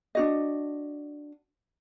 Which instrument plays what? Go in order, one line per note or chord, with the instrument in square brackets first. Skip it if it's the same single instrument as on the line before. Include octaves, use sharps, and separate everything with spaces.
[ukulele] D4 F#4 D#5